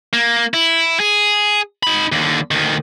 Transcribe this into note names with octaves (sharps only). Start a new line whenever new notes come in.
A#3
E4
G#4
D#4 B5
D#2 D3
D2 D#3